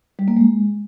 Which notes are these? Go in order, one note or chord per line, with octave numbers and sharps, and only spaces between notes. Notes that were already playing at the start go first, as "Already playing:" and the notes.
G3
A#3
G#3